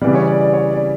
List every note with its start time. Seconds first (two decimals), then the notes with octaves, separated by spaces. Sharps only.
0.02 C#3 E3 G3 D5
0.15 C#5
0.27 D5
0.41 D5
0.53 C#5
0.71 D5